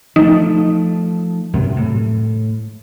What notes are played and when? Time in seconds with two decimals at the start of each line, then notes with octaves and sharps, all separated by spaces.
0.16 F3 A3 D#4
1.53 F#2 C3
1.76 A2